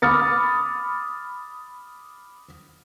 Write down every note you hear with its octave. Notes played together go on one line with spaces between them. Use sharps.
B5 D6 D#6 F6 A6 C#7